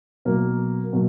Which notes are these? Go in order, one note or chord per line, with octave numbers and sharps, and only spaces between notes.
B2 F#3 A#3
B2 F#3 A#3